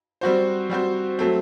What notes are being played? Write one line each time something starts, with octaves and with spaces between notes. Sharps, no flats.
G3 C4 F#4 C5
G3 C4 F#4 C5
F#3 A3 C4